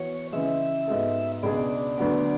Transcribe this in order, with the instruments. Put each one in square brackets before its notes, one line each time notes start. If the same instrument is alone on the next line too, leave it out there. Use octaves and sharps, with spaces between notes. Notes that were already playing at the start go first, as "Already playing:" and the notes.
Already playing: [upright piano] E3 B3 F#4 B4 [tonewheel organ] C#5
[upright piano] C#3 E3 G#3 [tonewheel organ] E5
[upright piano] G#2 G#3 B3 F#4 A4
[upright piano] C#2 B2 G#3 D4 G#4 [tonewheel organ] D5
[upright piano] D2 D3 F#3 B3 D4